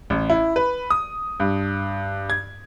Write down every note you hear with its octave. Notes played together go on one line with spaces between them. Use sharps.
A1
E4
B4
D#6
G2
G#6